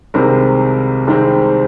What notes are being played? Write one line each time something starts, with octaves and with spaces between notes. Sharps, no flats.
C2 C3 D#3 G#3 C4 A#4
C2 C3 D#3 G#3 C4